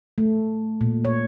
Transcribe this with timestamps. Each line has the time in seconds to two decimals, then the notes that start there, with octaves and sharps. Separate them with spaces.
0.18 A3
0.81 A#2
1.05 C#5